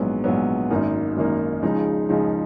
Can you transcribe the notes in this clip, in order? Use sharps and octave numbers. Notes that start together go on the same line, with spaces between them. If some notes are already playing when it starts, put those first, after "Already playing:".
Already playing: A#1 G#2 F#3 B3
A#1 G#2 F#3 B3
G#1 F#2 D#3 A#3 D#4
G#1 F#2 D#3 A#3 D#4
C#2 C#3 F3 G#3 D#4
C#2 C#3 F3 G#3 D#4